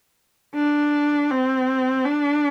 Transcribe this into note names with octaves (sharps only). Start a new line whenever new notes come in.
D4
C4
D4